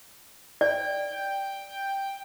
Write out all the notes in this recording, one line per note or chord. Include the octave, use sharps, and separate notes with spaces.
D5 G5